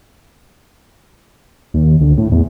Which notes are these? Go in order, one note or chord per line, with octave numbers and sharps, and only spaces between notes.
D#2
D2
A2
E2